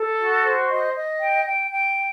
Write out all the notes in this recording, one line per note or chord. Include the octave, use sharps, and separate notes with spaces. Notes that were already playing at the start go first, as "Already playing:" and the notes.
Already playing: A4
F#4
C5
D#5
D#5
G5
G5
G5